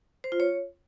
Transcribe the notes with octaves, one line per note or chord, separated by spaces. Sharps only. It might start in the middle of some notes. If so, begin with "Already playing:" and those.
C5
F4
C#5